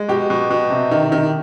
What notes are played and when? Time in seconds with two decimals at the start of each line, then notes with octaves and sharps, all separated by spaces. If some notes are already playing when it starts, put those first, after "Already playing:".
Already playing: G#3
0.09 B2 G4
0.30 B2
0.50 B2
0.70 C3
0.91 D#3
1.12 D#3